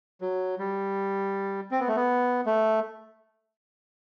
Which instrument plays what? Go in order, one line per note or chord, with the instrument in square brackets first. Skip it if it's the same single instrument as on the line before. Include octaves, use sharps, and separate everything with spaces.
[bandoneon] F#3
G3
C4
B3
A3
B3
A3